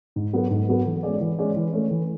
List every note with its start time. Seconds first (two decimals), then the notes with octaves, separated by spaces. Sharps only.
0.16 G#2
0.33 F#3 B3 F#4 A4
0.51 G#2
0.68 F#3 B3 F#4 A4
0.86 E3
1.03 G#3 C#4 G#4 D5
1.21 E3
1.39 G#3 C#4 G#4 D5
1.56 E3
1.73 A3 C#4
1.91 E3